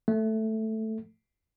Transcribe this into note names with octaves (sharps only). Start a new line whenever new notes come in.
A3